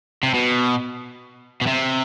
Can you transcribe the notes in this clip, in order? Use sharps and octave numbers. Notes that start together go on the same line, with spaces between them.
C3
B2
B2
C3